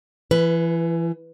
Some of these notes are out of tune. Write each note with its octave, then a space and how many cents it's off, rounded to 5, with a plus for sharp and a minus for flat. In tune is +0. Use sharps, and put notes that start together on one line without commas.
E3 +30 B4 +0